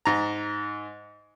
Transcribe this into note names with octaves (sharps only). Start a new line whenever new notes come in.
G#2 A#5